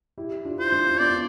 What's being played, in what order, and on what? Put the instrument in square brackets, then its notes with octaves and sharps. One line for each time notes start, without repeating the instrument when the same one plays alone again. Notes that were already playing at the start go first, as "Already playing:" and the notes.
[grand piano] E4 G4
D4 F4
[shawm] C5
[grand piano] D4 F4
[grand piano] B3 D4 [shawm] D5